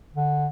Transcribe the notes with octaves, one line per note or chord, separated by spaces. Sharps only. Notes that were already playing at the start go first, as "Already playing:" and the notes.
D3